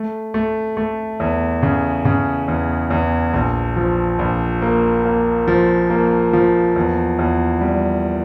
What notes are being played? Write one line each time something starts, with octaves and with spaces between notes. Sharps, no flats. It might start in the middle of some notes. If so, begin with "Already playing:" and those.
Already playing: A3
A3
A3
E2
C#3
C#3
E2
E2
A#1
F3
A#1
A#3
A#3
F3
A#3
F3
E2
E2
G3